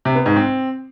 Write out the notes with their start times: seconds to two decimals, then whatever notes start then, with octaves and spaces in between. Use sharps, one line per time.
0.05 C3
0.16 B3
0.26 G#2
0.36 C4